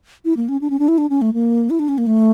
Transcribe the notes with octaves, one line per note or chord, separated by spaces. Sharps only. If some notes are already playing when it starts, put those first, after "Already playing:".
E4
A#3
C#4
D4
C#4
D4
E4
D4
C#4
A3
A#3
E4
D4
C#4
A#3
A3